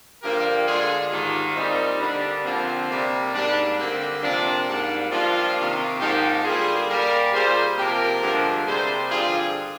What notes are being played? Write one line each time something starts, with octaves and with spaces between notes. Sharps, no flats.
G2 D3 F3 A#3 G4 A#4
D3 G#3 F4 G#4
G#2 D#3 G3 A#3 D4 F4
A#2 G3 A#3 C4 D#4
D3 G3 A#3 D4
D3 F3 A#3 C4
C3 G3 A#3
G#2 G3 A#3 D4
D3 G3 A#3 C4
C3 F3 A#3 D4
G#2 G3 A#3 D4
G2 F3 A#3 D4 F4
C3 D#3 A#3
G#2 F3 A#3 D#4 G4
D3 G3 A#3 F4 G#4
A#2 G3 A#3 G4 A#4
A#2 G3 A#3 G#4 C5
C3 F3 A#3 G4 A#4
G2 D3 F3 G#3
C3 G3 A#3 G#4 C5
G2 D3 F3 F4 G#4